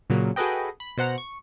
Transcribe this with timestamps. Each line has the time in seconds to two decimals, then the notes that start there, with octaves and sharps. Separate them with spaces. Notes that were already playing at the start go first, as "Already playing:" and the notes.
0.10 A#2 C#3 F#3 A#3
0.36 F#4 G#4 A4 B4 D#5 G5
0.80 B5
0.98 B2 C5 F#5 A#5
1.18 C#6